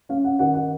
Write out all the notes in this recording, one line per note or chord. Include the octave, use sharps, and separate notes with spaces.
C#4 F5
F#5
D#3 F#5
F#5